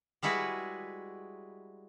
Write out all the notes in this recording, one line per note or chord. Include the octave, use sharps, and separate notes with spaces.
G3 G#3 E4 F#4 G#4 B4